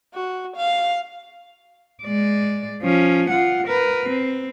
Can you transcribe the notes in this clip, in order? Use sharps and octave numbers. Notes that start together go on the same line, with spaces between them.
F#4
F5
G#3 D5
F3 C#4
F4 F#5
A#4 B4
C4